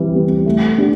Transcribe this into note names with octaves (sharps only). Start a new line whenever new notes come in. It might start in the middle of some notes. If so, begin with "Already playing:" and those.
Already playing: E3 G3 C4
G3 C4
A3
D4 G4